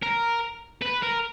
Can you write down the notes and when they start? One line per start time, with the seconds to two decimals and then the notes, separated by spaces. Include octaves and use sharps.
0.02 A#4
0.82 B4
1.02 A#4